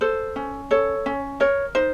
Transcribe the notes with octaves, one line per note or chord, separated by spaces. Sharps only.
A4 C5
C#4
A4 C#5
C#4
A#4 C#5
D#4 C5